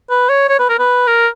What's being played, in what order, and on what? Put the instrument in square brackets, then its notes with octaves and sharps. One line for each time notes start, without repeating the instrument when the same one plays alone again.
[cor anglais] B4
C#5
C#5
B4
A#4
B4
A#4